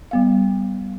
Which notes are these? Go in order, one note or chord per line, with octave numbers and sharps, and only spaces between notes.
G3 B3 F5